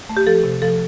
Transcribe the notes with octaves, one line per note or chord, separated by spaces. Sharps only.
A3
G4
F3 A4
C3
F3 A4